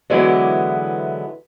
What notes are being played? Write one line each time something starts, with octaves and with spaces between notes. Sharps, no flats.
D3 E3 F#3 G#3 B3 E4